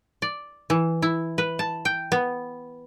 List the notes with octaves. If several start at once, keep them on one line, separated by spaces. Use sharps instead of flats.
D5
E3
E4
B4
A5
G5
B3